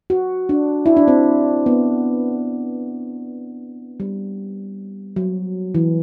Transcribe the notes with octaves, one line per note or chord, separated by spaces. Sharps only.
F#4
D4
E4
D4
C4
B3
G3
F#3
E3